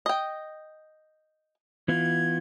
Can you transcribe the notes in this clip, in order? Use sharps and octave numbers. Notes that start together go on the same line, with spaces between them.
D#5 G5
E3 B3 F4 G#6